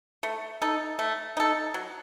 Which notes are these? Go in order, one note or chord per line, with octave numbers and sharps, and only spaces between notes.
A3
D#4 A4
A3
D#4 A4
F#3